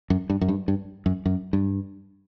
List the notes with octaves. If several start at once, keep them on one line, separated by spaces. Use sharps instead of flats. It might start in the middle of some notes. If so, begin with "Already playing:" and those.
F#2
G2
F#2
G2
G2
F#2
F#2
G2